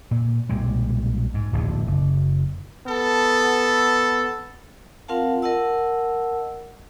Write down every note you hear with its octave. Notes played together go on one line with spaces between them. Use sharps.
A#2
B1 A#2 G3 G#3
G#2
D1 A#1 D#2
F#1
B3 A4
C4 F4 A#4 F5 F#5 A5
A#4 D#5 F#5 A5 E6